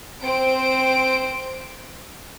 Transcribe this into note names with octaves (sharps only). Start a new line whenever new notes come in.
C4 C5 D7